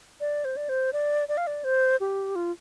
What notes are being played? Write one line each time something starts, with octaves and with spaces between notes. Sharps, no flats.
D5
C5
D5
C5
D5
D5
F5
D5
C5
G4
F4